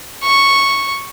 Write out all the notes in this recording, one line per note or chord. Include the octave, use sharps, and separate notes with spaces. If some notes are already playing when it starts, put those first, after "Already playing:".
C#6